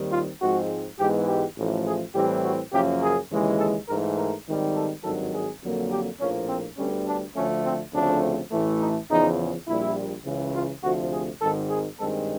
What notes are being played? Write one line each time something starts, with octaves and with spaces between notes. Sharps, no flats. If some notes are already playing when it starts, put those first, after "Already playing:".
Already playing: D#2 D#3 G3 C4
F4
G#2 F3 G#3 C4 F#4
G#2 E3 G#3 B3 G4
G4
A1 A2 F3 A3
G#4
A2 E3 G3 C4 G4
F#4
F#2 C#3 F3 A#3 G4
G#4
D#2 C#3 E3 G#3
A4
G#2 E3 A3 A#4
A#4
G#1 G#2 D#3 G3
A4
G#1 G2 D#3 F#3 A4
G#4
F2 D3 F#3 A#3
G4
A#1 A2 F3 A#3 C#4
C4
D2 D3 G3 B3 C#4
D4
D2 D3 F3 A3 C#4
C4
D2 C#3 F3 A3 C4 D4
A1 A2 E3 A3
D#4
E2 C#3 F3 D#4
A#1 A#2 G3 E4
C#2 C#3 E3
F4
D2 C3 F3 A3 F#4
G#4
G#1 G#2 D#3 A4
G#4
G2 D#3 G#3 C4 A4